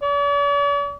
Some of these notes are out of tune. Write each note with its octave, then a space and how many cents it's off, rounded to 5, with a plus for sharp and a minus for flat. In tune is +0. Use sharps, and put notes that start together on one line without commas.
D5 -45